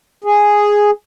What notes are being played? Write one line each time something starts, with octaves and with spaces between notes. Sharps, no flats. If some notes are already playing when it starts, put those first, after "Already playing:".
G#4